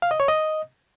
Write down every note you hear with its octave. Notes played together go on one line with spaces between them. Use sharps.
F5
D#5
C#5
D#5